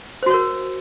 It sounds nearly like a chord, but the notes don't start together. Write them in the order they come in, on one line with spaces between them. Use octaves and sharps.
C5 F#4 C#5 A#4